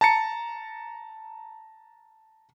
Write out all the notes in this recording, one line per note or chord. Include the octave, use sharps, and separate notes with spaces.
A5 A#5 A6 C#7